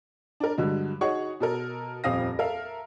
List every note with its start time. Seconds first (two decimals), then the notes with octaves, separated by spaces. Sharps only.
0.40 D4 A#4
0.58 G2 D3 F#3 G#3
1.01 D#4 F#4 G#4 C#5 F#5 C#6
1.40 B2 A4 A#4
2.04 D#1 F2 C4 F5 D#6 A#6
2.39 A4 A#4 E5 F5